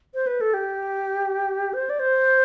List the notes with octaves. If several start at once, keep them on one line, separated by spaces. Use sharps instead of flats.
C5
B4
A4
G4
C5
D5
C5